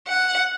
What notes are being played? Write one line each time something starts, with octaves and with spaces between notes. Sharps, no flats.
F#5